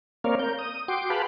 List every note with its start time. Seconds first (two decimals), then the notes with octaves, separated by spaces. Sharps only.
0.24 A#3 C4 A#4 C#5 D5 F5
0.39 A#4 G6
0.59 D#6
0.88 F#4 G5 C6 D6
1.10 G#4 B4 F5 F#5 A5 B5